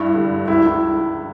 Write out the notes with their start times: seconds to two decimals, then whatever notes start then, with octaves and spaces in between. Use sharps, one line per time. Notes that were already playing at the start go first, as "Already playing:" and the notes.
Already playing: G2 E4
0.14 D3 G3
0.48 C#2 E4
0.65 E4